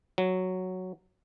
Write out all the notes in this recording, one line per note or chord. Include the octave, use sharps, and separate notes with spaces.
F#3